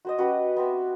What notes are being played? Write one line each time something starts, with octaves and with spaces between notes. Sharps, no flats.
F#4 C5 D#5
C#4 F#4 G4 B4
B3 C4 E5